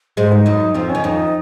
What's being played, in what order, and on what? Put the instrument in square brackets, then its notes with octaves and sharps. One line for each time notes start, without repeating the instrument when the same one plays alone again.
[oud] G#2 G#3 [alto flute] C5
[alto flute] D#4
[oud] F#2 F#3
[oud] F2 F3 [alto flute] C4
[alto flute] C#4
[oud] D#3
[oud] F2 F3 [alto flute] D#4